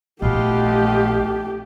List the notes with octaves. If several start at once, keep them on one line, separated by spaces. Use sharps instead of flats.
A#1 B2 A3 F4 G4 D#5